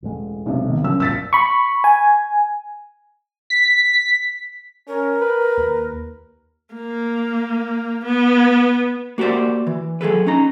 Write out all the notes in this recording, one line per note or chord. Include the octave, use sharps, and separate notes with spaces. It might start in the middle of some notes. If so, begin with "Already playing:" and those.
E1 A1 G#3
B1 C3
D#3 B3
F#1 G2 C#3 F#3 E6
D1 A#1 G2 E6 A6 B6
B5 C#6
G#5
B6
C#4 A#4
B4
D#2
A#3
B3
A#3 F#4 G4 C5 D5
E3
F#3 G#4 A4 B4
C#4 D#4 A#5